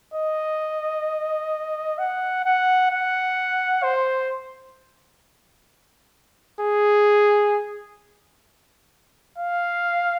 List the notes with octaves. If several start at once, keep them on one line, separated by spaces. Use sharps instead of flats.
D#5
F#5
F#5
F#5
C5
G#4
F5